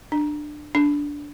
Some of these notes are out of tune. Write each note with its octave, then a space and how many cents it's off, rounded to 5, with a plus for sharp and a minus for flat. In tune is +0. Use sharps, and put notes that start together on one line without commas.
D4 +20
D4 -10